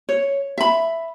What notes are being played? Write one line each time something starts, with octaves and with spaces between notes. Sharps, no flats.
C#5
E5 B5